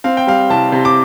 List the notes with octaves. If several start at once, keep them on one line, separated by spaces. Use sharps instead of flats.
C4 F5
G5
G3 F5
C2 A5
C3
D6